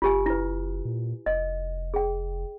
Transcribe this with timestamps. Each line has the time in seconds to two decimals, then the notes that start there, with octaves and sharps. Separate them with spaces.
0.02 F#1 F4 G4 G#5
0.26 E4 B4
0.85 A#2
1.26 F1 D#5
1.94 G#4 G5